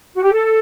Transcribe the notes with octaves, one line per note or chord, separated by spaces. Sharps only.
F#4
G4
A4